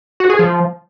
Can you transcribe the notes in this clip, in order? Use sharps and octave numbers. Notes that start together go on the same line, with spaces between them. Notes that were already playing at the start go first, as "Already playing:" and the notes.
F#4
G#4
F3